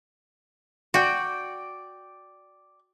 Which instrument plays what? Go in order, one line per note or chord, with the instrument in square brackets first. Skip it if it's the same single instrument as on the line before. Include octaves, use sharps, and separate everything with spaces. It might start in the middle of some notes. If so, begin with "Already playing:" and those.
[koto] F#4 [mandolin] D5 G5